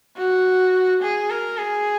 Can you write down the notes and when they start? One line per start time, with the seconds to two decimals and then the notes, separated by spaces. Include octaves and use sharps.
0.17 F#4
1.02 G#4
1.30 A#4
1.58 G#4